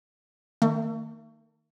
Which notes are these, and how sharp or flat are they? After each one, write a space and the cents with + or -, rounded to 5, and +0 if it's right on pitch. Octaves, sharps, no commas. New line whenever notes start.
D#3 +0 A3 +45